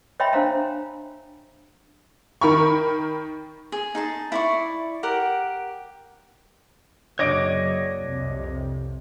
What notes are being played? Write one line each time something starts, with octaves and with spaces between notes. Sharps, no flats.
C#5 D#5 E5 G5 B5 C6
D4 C5 F5 A#5
D#3 A#4 B5 C#6
G#4
D#4 G#4 A5
E4 D5 C#6
G4 A#4 F#5
F#1 F#3 D4 C#5 D#5 D6 D7
C2 F2 C3